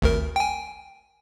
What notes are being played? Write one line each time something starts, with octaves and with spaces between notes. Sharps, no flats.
G#1 D2 A#4
G5 G#5